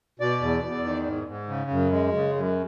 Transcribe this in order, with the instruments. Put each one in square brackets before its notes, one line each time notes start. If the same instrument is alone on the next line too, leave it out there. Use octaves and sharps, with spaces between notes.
[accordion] B2 D5
E2
E2
D#3
G#2
G#2
C#3
F#2
G#3
C#3
F#2